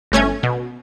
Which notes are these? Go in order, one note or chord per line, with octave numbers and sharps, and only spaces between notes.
G1 A3 C#4 G#6
B2